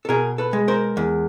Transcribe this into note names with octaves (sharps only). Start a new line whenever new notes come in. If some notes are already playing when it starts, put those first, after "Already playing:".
A4
B2 G#4 A#4
A4 B4
G#3
A#4 C5
E2